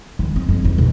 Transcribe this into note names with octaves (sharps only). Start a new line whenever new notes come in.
D#3
C4
F2
E3
B2